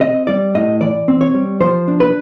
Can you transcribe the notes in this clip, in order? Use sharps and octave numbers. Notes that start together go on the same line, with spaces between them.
C4 D#5
G3 D5
A2 D#5
E3 D5
C4
C#5
G3
F3 C5
D4
B4